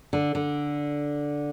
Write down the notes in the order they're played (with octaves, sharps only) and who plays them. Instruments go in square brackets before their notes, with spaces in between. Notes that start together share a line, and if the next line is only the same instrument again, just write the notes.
[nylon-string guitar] D3
D3